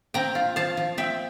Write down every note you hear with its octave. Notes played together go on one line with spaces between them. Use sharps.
C4 G5 A#5
F4
F3 F5 A5
F3
C4 E5 G5